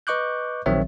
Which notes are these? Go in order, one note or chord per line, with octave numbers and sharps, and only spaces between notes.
B4 D#5 C#6 D6 F#6 G6
A#1 D#3 F#3 C4 C#5 E5